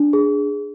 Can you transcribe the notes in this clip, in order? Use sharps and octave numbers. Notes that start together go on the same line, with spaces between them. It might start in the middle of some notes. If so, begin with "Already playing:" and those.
Already playing: D4
G#4